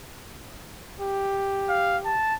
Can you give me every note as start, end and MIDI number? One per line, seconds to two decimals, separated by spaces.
1.01 2.17 67
1.69 1.98 77
2.05 2.34 81